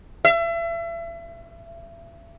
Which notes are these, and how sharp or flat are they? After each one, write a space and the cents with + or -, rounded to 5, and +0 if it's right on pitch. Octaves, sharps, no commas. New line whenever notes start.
E5 +35